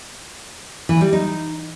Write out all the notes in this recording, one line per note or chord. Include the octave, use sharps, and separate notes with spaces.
E3
G3
D#4